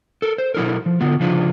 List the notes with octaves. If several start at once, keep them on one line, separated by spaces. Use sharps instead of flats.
A4 A#4
C5
B2 F#3 E4 A4 A#4
F3
D3 F#3 B3 F4
C#3 F3 D4 F4 G#4